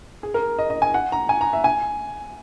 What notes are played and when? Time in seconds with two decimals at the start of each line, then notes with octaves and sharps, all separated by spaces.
0.23 G#4
0.34 A#4
0.59 D#5
0.70 D#5
0.82 G#5
0.94 F#5
1.12 A#5
1.29 G#5
1.41 A#5
1.53 E5
1.64 G#5